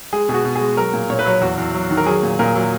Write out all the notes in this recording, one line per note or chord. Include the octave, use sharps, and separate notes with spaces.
G#3 G#4
B2 G#4
F#4
B2
G#3 G#4
F#3 A#4
A#2
A#2 C#5
B4
F#3 C#5
E2 F#4
E2
F#3
D#3
A#4
F#3 G#4
A#2
A#2 A#4
F#3